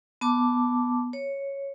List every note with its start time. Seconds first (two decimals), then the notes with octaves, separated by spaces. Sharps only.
0.21 B3 A5 D6
1.13 C#5